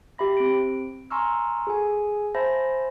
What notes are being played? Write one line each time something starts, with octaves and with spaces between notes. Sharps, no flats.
G4 E5 B5 A#6
C4 D7
G#5 A#5 C6 C#6 E6 F6
G#4 A4 G#5
C5 E5 G#5 A5 B5 A#6